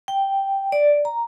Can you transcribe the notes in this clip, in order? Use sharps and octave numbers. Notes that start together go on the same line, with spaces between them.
G5
D5
A#5